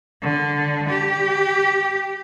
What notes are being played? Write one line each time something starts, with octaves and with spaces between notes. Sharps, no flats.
D3
G4